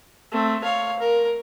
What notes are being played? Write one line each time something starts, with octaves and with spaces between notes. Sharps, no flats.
A3 C4
C#5 F5
A#4